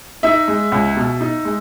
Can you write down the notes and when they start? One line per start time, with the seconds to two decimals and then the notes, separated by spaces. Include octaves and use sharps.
0.23 D#4 E5
0.48 G#3
0.72 C#2
0.96 B2
1.21 D#4
1.45 G#3